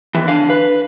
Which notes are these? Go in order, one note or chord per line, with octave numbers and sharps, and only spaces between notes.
D#2 E3
D3 F5
B4